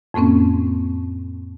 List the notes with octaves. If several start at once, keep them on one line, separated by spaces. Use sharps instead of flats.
F2 A2 A#3 C4 C#4